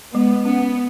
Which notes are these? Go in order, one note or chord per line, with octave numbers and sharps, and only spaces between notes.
G#3 B3
B3 C#4